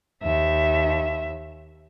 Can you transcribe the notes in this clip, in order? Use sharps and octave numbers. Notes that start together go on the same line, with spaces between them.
D#2 E5